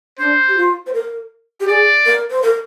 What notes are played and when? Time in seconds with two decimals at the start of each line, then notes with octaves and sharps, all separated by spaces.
0.19 D4 C5
0.48 G4
0.57 F4
0.87 C5
0.93 A#4
1.60 G4
1.68 G#4 D5
2.06 A#4
2.31 C5
2.42 A#4